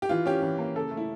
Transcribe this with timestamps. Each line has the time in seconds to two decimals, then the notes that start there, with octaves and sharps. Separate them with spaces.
0.02 G4
0.09 E3 F4
0.26 C#4 G4
0.42 E3
0.58 A#3
0.76 C#3 A4
0.91 A3
0.97 E4